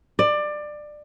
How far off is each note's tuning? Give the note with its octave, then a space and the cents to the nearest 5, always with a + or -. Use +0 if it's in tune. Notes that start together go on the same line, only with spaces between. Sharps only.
D5 +20